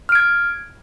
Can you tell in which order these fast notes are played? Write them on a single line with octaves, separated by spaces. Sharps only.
F6 D7 G#6